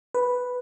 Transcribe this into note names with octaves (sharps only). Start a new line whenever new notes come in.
B4